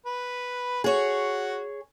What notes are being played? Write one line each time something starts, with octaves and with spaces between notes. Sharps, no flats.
B4
F#4 G#4 C#5